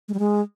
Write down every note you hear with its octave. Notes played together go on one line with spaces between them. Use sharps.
G#3
G3
G#3